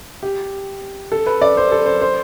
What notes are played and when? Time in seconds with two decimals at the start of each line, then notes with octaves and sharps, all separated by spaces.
0.23 G4
1.12 A4
1.26 B4
1.42 D5
1.57 C5
1.72 A4
1.86 C5
2.01 C5